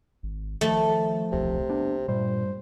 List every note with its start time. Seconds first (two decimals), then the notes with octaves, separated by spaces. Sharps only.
0.23 G#1
0.61 D#3 F3 A3
1.32 D1 B1 E2 C3
1.69 B3 D4
2.08 G2 A#2 G3 C5